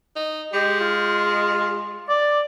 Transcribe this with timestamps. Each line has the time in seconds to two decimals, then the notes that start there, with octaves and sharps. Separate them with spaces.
0.16 D#4
0.53 G#3 G4
0.80 F4
2.09 D5